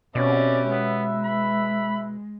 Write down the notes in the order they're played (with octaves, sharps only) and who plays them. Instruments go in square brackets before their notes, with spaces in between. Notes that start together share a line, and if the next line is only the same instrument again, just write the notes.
[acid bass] B2 [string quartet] C4 C#4 G4 [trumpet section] B4 E5 [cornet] D5
[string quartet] G#3 [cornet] B3
[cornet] B5